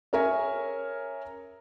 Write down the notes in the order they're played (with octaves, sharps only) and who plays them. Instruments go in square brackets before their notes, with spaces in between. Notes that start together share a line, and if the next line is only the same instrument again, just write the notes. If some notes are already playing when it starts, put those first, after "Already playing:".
[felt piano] C#4 G#4 A#4 C#5 E5 G#5